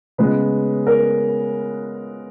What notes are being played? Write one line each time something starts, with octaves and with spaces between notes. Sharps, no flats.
C#3 G#3 B3 B4
A#4